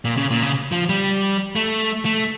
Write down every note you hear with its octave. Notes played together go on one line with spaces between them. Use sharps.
A#2
C#3
A#2
C#3
F3
G3
A3
A3